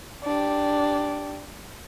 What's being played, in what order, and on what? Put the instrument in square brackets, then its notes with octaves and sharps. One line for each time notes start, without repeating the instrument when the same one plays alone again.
[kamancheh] D4 G4